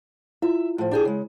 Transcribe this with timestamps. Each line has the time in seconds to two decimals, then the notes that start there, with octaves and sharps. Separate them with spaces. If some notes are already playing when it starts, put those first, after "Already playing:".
0.42 E4 F4 E5
0.78 A2 F3
0.91 D4 G4 G#4
1.05 C#3 G#3